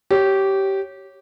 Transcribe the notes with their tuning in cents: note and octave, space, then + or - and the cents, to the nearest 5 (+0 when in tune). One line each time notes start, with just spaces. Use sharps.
G4 -15 C#5 -5